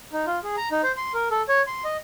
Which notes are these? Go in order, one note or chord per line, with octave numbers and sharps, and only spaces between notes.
D#4
F4
G#4
A#5
D#4
C5
C6
A#4
A4
C#5
C6
D#5